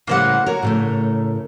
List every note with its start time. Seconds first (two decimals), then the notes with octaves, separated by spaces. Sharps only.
0.07 A2 C#3 G3 A#3 C5 F#5
0.46 F#4 A#4 C#5
0.63 A2 C#3 A3